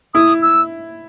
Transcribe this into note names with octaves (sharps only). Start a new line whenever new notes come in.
E4 D#6
E6